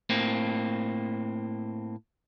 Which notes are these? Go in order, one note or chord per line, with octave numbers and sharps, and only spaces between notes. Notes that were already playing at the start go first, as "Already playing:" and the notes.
A2 A#3 C4